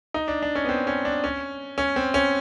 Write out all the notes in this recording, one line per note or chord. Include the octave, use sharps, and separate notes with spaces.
D#4
D4
D4
C#4
B3
C4
C#4
D4
C#4
C#4
C4
C#4